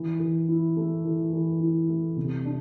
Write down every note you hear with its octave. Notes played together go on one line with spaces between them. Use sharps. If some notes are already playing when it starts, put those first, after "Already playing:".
Already playing: E3
E3
E4
A3
E3
E3
E4
A3
C3
D4